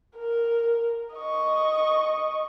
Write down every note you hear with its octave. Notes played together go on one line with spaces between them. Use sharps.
A#4
D#5 C#6